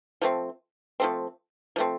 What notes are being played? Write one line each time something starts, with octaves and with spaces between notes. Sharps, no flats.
F3 A3 C4
F3 A3 C4
F3 A3 C4